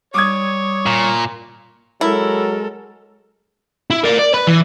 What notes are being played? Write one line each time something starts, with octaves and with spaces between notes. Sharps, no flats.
G3 C#5 D6 D#6 G#6
A#2
F#3 G#3 E4 A4 A#4
E4
A#4 D5
D5
B4
E3